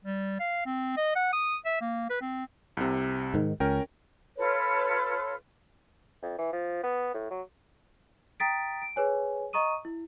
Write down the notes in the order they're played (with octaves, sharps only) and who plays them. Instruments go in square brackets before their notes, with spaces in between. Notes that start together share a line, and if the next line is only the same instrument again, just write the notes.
[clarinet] G3
F5
C4
D#5
F#5
D#6
E5
A#3
B4
C4
[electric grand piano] C2 C3
[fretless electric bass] G#2 D#3
[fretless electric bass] C#2 [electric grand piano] C#4 A#4 G5
[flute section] F4 A4 B4 C#5
[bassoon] F2
E3
F3
B3
A2
F#3
[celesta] G5 A#5 D#6 A6 B6 D7
D7
G#4 B4 C#5 G#5
D#5 A#5 C#6 D#6 D#7
E4